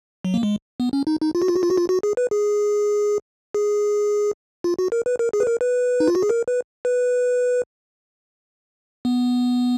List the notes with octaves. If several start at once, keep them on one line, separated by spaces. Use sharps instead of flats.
F#3
A#3
G#3
B3
C#4
D#4
D#4
F4
F#4
F4
F#4
F4
F#4
F4
F#4
G#4
B4
G#4
G#4
F4
F#4
A#4
B4
A#4
G#4
B4
A#4
B4
D#4
F4
F#4
G#4
A#4
B4
B4
B3